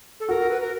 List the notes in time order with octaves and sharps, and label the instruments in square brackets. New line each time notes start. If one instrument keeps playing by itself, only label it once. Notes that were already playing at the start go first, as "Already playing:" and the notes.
[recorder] A4
[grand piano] F#4 [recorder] A#4
[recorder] B4
A#4